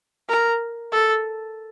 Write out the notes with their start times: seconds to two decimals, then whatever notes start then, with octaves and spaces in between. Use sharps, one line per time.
0.29 A#4
0.92 A4